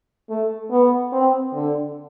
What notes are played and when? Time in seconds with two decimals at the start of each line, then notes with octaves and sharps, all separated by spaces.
0.29 A3
0.71 B3
1.12 C4
1.54 D3